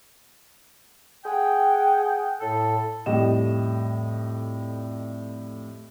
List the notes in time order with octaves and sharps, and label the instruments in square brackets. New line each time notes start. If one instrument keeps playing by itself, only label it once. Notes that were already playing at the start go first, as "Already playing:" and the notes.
[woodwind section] G#4 F#5 G5
A2 A4
[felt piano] F2 A2 G3 D#5 E7